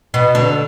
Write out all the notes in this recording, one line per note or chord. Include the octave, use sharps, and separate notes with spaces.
B2 B3
D3